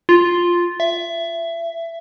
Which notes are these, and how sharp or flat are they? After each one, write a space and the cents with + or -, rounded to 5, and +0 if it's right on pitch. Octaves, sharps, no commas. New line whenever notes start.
F4 +0
E5 +20